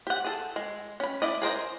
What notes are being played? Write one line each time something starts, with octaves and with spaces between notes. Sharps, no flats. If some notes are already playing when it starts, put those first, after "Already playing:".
G4 F#5
G#4 A4
G#3
C#4 B5
E4 D5 D#5
G#4 A#4 C5 D#5